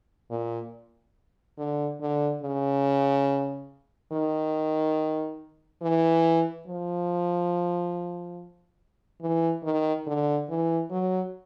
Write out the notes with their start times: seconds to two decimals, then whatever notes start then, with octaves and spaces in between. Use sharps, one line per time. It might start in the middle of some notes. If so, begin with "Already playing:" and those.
0.31 A#2
1.58 D3
2.01 D3
2.43 C#3
4.12 D#3
5.82 E3
6.67 F3
9.21 E3
9.64 D#3
10.07 D3
10.49 E3
10.91 F#3